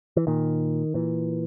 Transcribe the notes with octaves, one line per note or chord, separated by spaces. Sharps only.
E3
A#2 D#3
A#2 E3